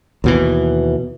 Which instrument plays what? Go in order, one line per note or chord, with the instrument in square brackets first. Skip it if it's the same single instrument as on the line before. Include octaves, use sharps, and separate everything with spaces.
[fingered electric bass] D#2 B2 E3